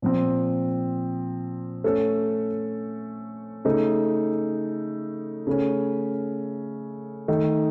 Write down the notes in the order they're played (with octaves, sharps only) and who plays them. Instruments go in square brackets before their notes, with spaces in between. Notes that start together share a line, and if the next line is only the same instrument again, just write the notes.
[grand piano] A#2 F3 C4
A3 C#4 A4
C#3 A3 D#4
C#3 A3 C#4
D#3 A3 D#4